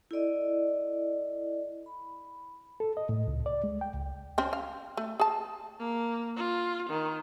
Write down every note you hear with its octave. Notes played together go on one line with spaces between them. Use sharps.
E4 A4 D5 D#5
B5
A4
D#5
A2
C#2
D5
G#3
G5
C#2
C4 C#4
F5
A3
G#4 A5
A#3
F4
D#3